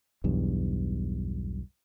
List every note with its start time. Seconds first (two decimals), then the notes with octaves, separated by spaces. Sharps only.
0.24 B1 E2 G2